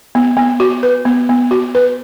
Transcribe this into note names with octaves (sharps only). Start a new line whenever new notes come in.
B3
B3
F#4
B4
B3
B3
F#4
B4